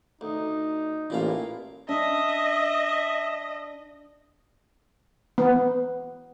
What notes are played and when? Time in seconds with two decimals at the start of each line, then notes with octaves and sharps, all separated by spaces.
0.21 D2 D#4
1.10 A1 A#2 E4 F5
1.89 D4 D#5 E5
5.38 B3